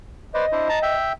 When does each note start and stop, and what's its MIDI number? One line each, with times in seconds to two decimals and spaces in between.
0.34 0.46 71
0.34 0.46 72
0.34 0.46 74
0.34 0.95 75
0.52 0.68 62
0.52 0.68 64
0.52 0.68 72
0.69 0.79 81
0.69 0.79 82
0.82 1.12 76
0.82 1.12 79